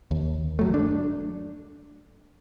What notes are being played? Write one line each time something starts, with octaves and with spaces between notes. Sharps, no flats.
D#2
G1 F#3 A3
D4